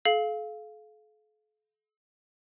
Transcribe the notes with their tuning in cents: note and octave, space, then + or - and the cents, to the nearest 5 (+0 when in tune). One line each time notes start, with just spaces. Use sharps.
A4 -45 F5 +0